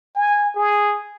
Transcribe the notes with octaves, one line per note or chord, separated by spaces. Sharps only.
G#5
G#4